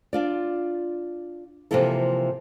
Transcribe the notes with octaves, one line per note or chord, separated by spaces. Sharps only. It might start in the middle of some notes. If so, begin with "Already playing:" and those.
D4 F4 D5
C3 E3 F3 A#3 E4 A4